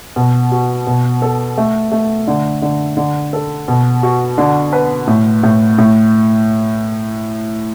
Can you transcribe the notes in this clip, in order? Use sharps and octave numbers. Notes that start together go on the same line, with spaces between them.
B2
F#4
B2
A4
A3
A3
D3
D3
D3
A4
B2
F#4
D3
B4
A2
A2
A2